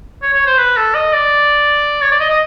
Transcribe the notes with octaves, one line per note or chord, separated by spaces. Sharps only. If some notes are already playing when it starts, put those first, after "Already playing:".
C#5
C#5
C5
B4
A4
D#5
D5
C#5
D5
D#5
D#5